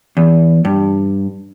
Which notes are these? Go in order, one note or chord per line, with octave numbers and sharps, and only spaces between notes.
E2
G2